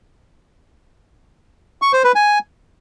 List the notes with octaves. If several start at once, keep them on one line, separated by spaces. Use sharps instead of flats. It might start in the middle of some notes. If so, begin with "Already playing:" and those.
C#6
C5
B4
G#5